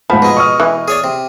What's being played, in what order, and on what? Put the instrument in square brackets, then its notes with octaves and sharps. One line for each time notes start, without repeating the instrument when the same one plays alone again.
[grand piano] G#2 F#5 B5 [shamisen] F3
[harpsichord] B2 G#3
[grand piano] C#6 D#6 F6
[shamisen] E3
[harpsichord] G#4 C#5 D5
C3